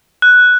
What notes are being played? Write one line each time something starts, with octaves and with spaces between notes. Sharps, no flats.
F#6